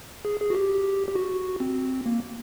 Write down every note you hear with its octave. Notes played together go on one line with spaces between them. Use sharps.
G#4
G#4
F#4
G4
G4
F#4
C4
A#3